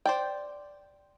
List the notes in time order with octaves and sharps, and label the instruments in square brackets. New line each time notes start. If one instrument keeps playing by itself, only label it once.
[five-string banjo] C5 D5 G5